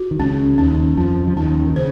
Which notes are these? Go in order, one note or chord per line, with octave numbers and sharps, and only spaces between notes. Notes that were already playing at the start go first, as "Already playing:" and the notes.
Already playing: F#4
D#3
C#2 C#3 C#4
D#2 D#3 C#4
F2 F3 C#4
F3
D#2 D#3 C#4
D#3
C#3 C5